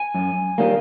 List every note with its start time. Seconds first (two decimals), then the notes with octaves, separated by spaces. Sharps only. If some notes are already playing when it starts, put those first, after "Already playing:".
Already playing: G#5
0.14 F#2
0.58 D#3 G3 A#3